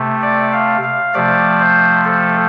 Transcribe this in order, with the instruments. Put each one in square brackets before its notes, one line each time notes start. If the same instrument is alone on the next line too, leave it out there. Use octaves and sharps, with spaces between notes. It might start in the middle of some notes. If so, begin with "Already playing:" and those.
Already playing: [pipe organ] C3 A3
D5
F5
F5
C3 F3 A3 D5
C5
A4